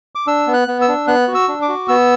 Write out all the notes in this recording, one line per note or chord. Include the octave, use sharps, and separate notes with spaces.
D6
D4 E6
B3
F#6
B3
E6
D4
B3 F#6
F#4
E6
D4
D6
F#4
B3 E6